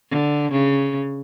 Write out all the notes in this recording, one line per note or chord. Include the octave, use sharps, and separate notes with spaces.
D3
C#3